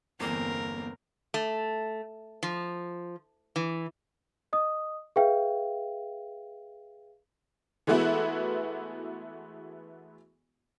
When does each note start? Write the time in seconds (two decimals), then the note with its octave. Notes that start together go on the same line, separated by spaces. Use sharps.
0.20 G1 E2 A#3 C4 A#4
1.34 A3
2.43 F3
3.56 E3
4.53 D#5 D#6
5.16 G#4 B4 E5 F5 G5
7.87 E3 G#3 A3 B3 E4 F#4